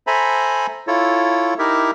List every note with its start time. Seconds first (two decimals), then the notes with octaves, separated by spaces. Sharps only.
0.07 A4 C5 E5 G#5 A#5 B5
0.87 E4 F4 A4 C#5
1.59 D#4 E4 G4 A#4 E5